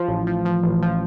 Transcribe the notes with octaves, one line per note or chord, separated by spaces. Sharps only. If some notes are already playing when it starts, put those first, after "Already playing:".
Already playing: F3
A1
F3
F3
A1
F3